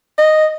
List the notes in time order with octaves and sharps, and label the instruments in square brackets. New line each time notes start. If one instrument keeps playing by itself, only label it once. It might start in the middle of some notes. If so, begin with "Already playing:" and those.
[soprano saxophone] D#5